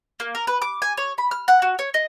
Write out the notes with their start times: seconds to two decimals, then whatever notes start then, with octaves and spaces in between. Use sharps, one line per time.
0.20 A#3
0.35 A#4
0.47 B4
0.62 D6
0.82 G#5
0.97 C#5
1.18 B5
1.31 F6
1.48 F#5
1.62 F#4
1.79 C#5
1.94 D#5